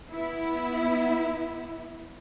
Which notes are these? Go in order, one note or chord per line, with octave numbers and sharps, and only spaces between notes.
B3 E4